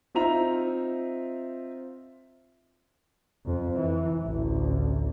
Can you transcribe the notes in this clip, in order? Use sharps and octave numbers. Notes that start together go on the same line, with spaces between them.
C4 D#4 F4 E5 A#5 F7
F2
E3
A1 D2